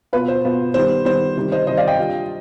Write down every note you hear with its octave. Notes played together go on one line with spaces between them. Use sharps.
B2 B3 F4 B4
C5
B2 B3 F4
D#3 G3 B3 C5
D#3 G3 B3 C5
C3 D#3 G3
C5 D#5
C3 D#3 G3 C5 D#5
D5 F5
D#5 G5
G3 D4 F4